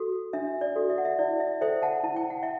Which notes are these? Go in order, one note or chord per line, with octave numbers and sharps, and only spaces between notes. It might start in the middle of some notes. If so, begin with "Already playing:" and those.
Already playing: F#4 A4
D4 E5
D5
F#4 A4
E5
F#5
E5
E4 D5
E5
A4 C5 E5 G5
F#5 A5
E4 A5
G5
F#5
E5 G5